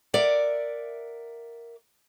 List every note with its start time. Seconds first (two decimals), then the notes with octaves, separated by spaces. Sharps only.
0.14 A#4 D5 E5 F#5